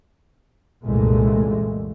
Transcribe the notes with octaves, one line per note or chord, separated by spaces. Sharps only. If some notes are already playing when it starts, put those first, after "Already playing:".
C2 F#2 A#2 E3 G#3 A3